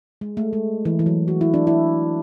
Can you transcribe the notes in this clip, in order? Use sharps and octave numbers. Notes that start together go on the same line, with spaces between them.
G#3
A3
G#3
E3
E3
F#3
F#4
E4
D4
E4